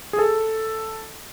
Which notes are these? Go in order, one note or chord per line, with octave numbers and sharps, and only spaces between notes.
G#4
A4